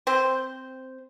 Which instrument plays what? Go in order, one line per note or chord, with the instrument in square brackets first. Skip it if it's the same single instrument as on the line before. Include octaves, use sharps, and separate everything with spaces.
[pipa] C4 C5